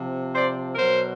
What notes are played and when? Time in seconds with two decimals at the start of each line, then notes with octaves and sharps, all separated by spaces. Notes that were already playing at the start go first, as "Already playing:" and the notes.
Already playing: C3 F3
0.34 C5 D5
0.75 B2 F#3 A#4 C5